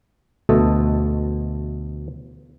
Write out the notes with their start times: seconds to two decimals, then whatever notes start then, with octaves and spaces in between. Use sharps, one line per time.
0.49 D2 B2 A3 A4 D#5